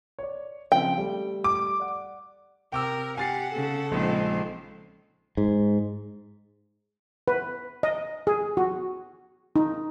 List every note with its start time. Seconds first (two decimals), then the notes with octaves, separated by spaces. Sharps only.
0.19 C#5 D5
0.72 C#3 F3 C4 G5
0.98 G3 A3
1.44 D6
1.80 D5 F#5
2.72 C3 A#4 G5 D6 E6
3.17 G4 F#5 G#5 A6 C7
3.52 C#3 A4
3.92 A#1 G#3 C4 D#4
5.37 G#2
7.28 B4
7.83 D#5
8.27 G#4
8.57 F#4
9.56 D#4